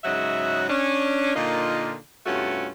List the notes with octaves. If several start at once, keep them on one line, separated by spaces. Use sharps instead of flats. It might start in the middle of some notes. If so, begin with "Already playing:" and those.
G#2 C#3 F#3 F#4 D#5 E5
C#4 D4
A#2 D3 A#3 D#4 F4
G2 C3 A3 C#4 F4 F#4